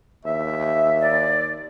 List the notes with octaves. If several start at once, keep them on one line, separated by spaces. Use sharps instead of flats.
D#2 E5
D5